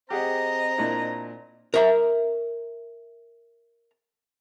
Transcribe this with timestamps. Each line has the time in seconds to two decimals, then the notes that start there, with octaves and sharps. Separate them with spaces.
0.10 C4 G4 G#4 D#5 F#5 A#5
0.78 A#2 D4 E4
1.74 A#4 E5 A#5